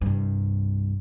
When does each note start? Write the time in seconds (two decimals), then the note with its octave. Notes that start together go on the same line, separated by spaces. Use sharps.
0.01 C2 G2